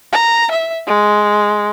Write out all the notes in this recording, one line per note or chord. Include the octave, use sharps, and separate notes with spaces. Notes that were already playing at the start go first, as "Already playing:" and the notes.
A#5
E5
G#3